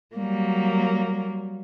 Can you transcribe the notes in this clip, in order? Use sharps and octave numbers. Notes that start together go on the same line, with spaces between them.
F#3 G3 A#3